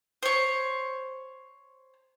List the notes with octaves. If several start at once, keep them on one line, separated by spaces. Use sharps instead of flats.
C5 C#5